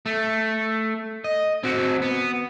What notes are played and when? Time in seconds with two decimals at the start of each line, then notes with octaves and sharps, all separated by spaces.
0.06 A3
1.24 D#5
1.63 C4 F#4
2.02 B3